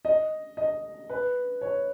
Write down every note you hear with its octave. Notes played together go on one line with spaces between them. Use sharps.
D#5
D#5
B4
C#5